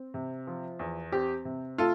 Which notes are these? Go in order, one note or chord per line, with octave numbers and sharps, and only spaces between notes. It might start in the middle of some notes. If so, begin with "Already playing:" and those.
Already playing: C4
C3
F3
E2
C4 G4
C3
A3 F4 A4